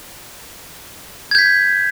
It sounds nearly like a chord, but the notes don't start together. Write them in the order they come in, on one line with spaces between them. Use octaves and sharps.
G#6 G6 B6